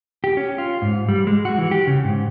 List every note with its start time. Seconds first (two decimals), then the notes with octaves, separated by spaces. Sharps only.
0.24 G4
0.37 C#4
0.58 F4
0.82 G#2
1.09 G3
1.27 G#3
1.45 F#4
1.58 E3
1.71 G4
1.87 C#3
2.04 G#2